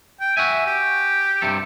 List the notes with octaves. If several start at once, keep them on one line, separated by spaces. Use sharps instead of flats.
G5
F#4 E5 G#5
G4
G2 C3 A4